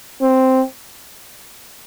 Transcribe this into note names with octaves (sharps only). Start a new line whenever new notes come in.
C4